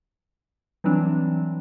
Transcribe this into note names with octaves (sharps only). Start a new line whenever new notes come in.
E3 F#3 G3 C4 D4